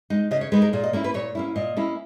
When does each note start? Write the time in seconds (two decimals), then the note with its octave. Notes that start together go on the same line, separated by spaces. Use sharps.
0.10 G#3 D#4
0.31 C#3 D#5
0.41 C#5
0.52 G#3 D#4 B4
0.62 A#4
0.73 A#2 G#4
0.84 D#5
0.93 A#3 C#4 E4
1.04 B4
1.14 A#2 C#5
1.35 A#3 C#4 E4
1.56 A#2 D#5
1.77 A#3 C#4 E4